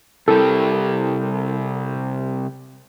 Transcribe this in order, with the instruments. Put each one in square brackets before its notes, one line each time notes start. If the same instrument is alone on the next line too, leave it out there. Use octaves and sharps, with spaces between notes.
[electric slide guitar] C3 G3 [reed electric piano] E4 A4 A#4